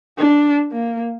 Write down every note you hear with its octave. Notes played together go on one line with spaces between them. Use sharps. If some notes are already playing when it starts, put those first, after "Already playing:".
D4
A#3